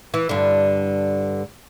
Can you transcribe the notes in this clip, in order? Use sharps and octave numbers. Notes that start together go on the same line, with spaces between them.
E3
G2 D3